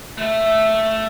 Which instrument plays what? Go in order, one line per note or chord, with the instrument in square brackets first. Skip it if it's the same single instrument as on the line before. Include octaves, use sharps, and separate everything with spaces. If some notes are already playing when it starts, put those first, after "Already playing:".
[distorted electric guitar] A3